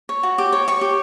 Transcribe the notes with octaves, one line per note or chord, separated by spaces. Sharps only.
C#5
F#4
G4
C#5
C#5 C#6
G4